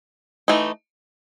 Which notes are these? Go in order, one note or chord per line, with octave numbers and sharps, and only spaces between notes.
E3 A3 D#4